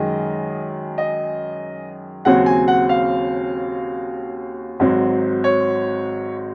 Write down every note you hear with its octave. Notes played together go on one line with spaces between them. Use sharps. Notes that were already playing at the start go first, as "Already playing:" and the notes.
Already playing: F#2 D#3 G#3 D#5
D#5
D#2 C#3 F#3 C4 F#5
G#5
F#5
F5
G#1 G#2 F#3 C4
C#5